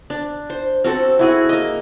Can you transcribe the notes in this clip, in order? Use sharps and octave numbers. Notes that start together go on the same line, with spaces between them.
D4
C5
C4 F#4 A4
E4 F#4 G#4
A#3 D#5